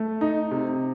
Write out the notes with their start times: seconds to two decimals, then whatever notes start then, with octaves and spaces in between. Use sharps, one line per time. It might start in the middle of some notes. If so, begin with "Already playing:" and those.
Already playing: A3
0.21 D#4
0.51 C3